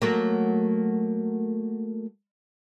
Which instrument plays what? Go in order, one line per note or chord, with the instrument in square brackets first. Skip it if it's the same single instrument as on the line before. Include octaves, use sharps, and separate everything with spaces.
[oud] F#3 A3 A#3